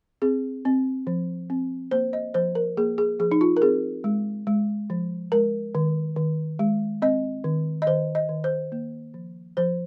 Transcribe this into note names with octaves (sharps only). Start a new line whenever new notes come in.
C4 G#4
C4
F3
C4
A#3 C5
D#5
F3 C5
A#4
A#3 G#4
G#4
F3 G#4
D#4
F4
A#4
C4 G#4
G#3
G#3
F3
G#3 A#4
D#3
D#3
G#3
C4 D#5
D#3
D#5
D#3 C5
D#5
D#3
C5
A#3
F3
F3 C5